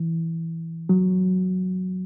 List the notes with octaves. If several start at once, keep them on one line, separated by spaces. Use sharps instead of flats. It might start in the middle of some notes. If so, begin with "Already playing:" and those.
Already playing: E3
F#3